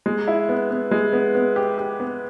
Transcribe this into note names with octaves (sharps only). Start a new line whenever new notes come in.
G#3
E4
B3
B3
G#3
B3
B3
G4
G4
B3